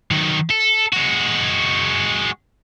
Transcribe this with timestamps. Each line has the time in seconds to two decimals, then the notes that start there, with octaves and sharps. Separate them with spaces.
0.11 D#3 F#3
0.51 A4
0.93 G#3 F#4